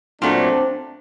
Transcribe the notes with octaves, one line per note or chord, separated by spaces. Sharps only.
A#2 F#3 A3 C4 D4